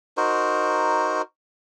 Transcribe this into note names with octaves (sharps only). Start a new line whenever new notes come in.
D#4 F#4 A#4 C5